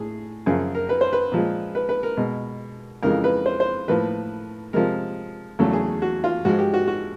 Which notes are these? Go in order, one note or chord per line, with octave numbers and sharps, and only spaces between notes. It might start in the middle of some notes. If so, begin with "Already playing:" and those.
Already playing: A2 G#4
F#2 C#3 F3 G#4
A#4
B4
C5
B4
A#2 F3 G#3
B4
B4
A#4
B2 G#3
F2 C#3 E3 G#3 A#4
B4
C5
C5
A2 F3 A#3 B4
C3 F3 G#3 A#4
E2 C#3 F#3 A3 A4
G#4
F#4
F4
G#2 F3 G#3 F#4
G4
F#4
F#4